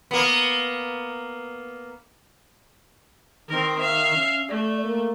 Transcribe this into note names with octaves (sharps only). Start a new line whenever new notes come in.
A#3 B3
D#3 C4 A#4
E5 F5
C#4
A3 D5
A#3